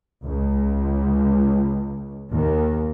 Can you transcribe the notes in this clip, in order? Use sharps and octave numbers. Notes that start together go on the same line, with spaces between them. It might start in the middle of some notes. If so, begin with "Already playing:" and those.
C#2
D#2